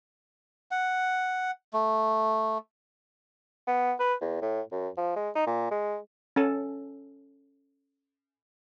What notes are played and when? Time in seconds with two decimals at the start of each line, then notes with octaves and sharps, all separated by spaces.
0.71 F#5
1.73 A3
3.67 B3
4.00 B4
4.21 E2
4.42 A2
4.72 F#2
4.97 F3
5.16 G#3
5.35 D#4
5.47 A#2
5.71 G#3
6.36 C#4 A4